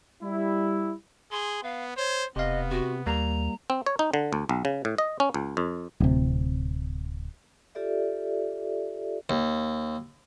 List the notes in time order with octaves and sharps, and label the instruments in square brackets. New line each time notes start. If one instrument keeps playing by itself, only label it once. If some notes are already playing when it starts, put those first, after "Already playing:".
[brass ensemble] G3 E4
[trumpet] G#4 [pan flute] C6
[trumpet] B3 [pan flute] F5
[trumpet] C5 [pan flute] C#5
[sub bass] E1 [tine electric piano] C3 F5 [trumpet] B3 [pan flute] D#5
[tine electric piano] C3 [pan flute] F#4
[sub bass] D#2 [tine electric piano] G3 A#3 [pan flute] A#5
[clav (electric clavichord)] C4
C#5
D#4
D3
D2
B1
C#3
A2
D#5
C#4
C#2
F2
[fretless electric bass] D1 C3
[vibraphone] F4 G4 A4 D5 E5
[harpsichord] D#2